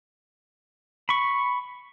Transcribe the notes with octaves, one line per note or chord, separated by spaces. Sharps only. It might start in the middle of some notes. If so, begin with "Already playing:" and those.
B5 C#6